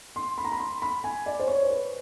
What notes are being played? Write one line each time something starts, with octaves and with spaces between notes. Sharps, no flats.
C6
B5
A#5
B5
C6
B5
G#5
D5
C5
C#5
C5
B4